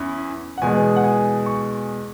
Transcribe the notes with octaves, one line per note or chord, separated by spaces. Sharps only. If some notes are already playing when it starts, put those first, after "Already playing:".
Already playing: E2 C#4 E4
F#5
E2 B2 G#3 G#5
F#5
G#5
C#6